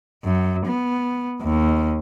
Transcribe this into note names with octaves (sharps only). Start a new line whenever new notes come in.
F#2
B3
D#2